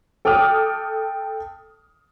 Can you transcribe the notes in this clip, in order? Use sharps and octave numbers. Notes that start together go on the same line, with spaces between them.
A4 G5 D6 D#6 F6